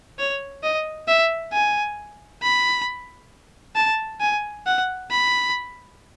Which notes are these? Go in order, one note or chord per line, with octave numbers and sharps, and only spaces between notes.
C#5
D#5
E5
G#5
B5
A5
G#5
F#5
B5